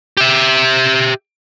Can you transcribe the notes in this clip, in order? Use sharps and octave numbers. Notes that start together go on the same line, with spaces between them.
G4 E5